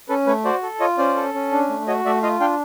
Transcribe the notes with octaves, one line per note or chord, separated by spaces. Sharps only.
C#4 A4 B4
A3 B4 C#5
F#4 C5 D5
A4
F4 C#5 D#5
C#4 C5 D5
A4
C#4
D4
A3
F#4 C#5 D#5
A3 D5 E5
F4 D#5 F5
D4 F5 G5